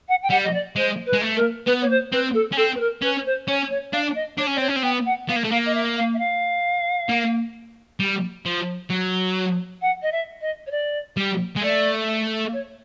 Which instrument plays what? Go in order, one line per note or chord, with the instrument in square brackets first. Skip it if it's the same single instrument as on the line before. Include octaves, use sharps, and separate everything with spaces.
[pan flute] F#5
G5
[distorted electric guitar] G3 [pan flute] F#5
[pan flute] D#5
D5
[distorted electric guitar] G#3 [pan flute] C5
[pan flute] B4
[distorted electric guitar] G#3
A3
[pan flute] A#4
[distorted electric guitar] B3 [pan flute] B4
[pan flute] C#5
C5
[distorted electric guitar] C4 [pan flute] B4
[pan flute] A4
[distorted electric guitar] C#4
[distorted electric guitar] C4 [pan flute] A4
[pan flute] B4
A#4
[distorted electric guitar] C#4 [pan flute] B4
[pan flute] C5
[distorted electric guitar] C#4 [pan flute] C#5
[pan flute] C#5
[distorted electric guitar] D4 [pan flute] F5
[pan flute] D#5
[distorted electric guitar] D4 [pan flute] C#5
[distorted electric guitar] C#4
[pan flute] D5
[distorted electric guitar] C4 [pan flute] C#5
[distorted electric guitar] C#4
C4
[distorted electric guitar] B3 [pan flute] G5
[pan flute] F#5
[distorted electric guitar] B3 [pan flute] F5
[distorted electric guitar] A#3
A3
[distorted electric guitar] A#3 [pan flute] F5
[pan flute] D#5
E5
F5
E5
F5
[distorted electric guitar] A#3
G3
F3
F#3
[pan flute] F#5
D#5
E5
D#5
C#5
D5
[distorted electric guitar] G3
G#3
[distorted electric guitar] A3 [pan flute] D5
[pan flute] C#5